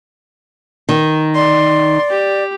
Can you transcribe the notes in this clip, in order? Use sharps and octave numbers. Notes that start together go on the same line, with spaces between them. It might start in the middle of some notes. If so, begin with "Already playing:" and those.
D#3
D5 C6
G4